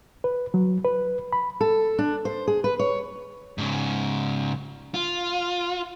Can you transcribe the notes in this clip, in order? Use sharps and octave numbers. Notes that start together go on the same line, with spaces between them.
B4
F#3
B4
B5
A4
D4
C5
G#4
B4
C#5
G#2 C#3
F4